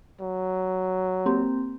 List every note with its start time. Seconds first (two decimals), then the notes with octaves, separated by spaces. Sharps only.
0.21 F#3
1.26 A#3 C4 G4